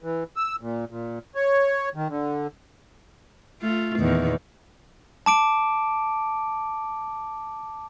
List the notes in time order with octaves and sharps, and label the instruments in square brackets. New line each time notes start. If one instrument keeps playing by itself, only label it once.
[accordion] E3
E6
A#2
A#2
C#5
D#3
D3
[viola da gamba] A3 F4
E2 A#2 D#3
[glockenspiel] A5 D6 D7